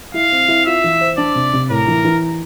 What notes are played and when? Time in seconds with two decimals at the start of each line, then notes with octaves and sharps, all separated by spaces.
0.14 E4 F5
0.32 C4
0.48 E4
0.66 F4 E5
0.84 E3
1.01 C5
1.18 D4 D5
1.35 C3
1.53 C3
1.70 A2 A#4
1.88 E3
2.05 E3